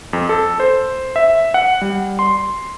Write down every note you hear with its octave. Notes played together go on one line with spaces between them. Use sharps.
F2
A4
C5
E5
F#5
G3
C6